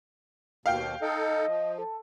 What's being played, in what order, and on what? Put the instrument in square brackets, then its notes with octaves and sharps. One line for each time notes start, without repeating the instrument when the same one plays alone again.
[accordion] D#2 B2 [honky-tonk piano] F5 G5
[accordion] D#4 A4 [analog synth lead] D#5
[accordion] F3
[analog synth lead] A4